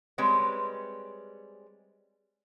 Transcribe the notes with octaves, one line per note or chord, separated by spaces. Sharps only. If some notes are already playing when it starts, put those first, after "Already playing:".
G3 G#3 C4 B4 C#5